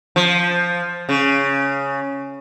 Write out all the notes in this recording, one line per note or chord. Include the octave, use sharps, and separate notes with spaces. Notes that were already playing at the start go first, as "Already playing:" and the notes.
F3
C#3